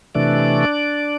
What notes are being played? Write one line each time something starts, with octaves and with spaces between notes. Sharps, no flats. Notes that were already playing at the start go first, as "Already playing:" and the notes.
C3 E3 A3 D4 D5